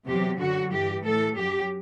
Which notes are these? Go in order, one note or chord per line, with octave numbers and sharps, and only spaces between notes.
E2 C3 F#3 G4
F#2 D3 F#3 F#4
G2 E3 G4
A2 E3 A4
F#2 F#3 G4